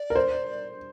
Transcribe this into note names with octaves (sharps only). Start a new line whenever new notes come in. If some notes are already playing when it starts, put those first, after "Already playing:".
Already playing: D5
A#4
C5